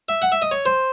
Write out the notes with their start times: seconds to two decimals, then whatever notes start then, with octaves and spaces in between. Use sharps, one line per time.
0.09 E5
0.22 F#5
0.32 E5
0.42 D#5
0.51 C#5
0.66 C5